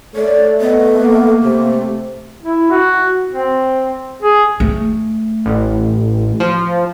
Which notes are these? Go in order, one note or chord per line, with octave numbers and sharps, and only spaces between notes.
A3 C#5 D5
B3 D#5
A#3
C3 A3
E4
F#4
C4
G#4
A3
A1
F3